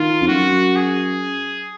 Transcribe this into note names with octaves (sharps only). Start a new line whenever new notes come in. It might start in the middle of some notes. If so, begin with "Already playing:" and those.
Already playing: D#3 F4
F2
F#2 F#4
G#4